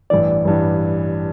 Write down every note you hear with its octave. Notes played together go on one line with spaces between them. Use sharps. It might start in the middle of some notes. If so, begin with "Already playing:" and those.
A1 G2 E3 D5
A1 G2 E3